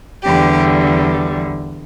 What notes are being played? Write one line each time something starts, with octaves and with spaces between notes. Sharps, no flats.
E2 D3 G3 G4